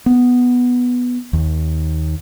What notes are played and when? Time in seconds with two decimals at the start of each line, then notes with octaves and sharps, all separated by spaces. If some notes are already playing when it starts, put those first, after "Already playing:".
0.06 B3
1.33 D#2